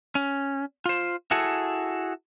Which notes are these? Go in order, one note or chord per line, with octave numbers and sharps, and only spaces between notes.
C#4
F4 C5
E4 F#4 G#4 A4